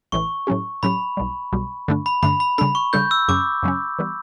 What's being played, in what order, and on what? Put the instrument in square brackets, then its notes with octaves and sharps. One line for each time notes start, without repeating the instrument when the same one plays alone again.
[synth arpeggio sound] A1 A2 E3 [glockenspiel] C#6
[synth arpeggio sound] A2 F#3 C#4 G4
[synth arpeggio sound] A2 F#3 C#4 G4 [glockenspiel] B5
[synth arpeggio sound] B1 B2 G3
B1 B2 G3
G2 D3 A3 D4
[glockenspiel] B5
[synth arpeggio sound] G2 D3 A3 D4 [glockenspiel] B5
[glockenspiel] B5
[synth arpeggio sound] C#3 G3 D4 A4 [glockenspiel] B5
[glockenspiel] C#6
[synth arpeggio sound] C#3 G3 D4 A4 [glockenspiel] G6
[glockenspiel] E6
[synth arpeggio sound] F#2 C#3 F#3 C#4 [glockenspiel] D6
[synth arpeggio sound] F#2 C#3 F#3 C#4
E3 G3 B3